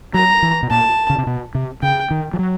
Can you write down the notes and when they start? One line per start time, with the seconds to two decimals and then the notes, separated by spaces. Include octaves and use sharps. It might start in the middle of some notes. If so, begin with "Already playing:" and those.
0.14 F#3 A#5
0.43 E3
0.63 B2
0.70 A#2 A5
1.10 C#3
1.18 C3
1.27 B2
1.55 C3
1.82 C#3 G5
2.11 D#3
2.34 F3
2.39 F#3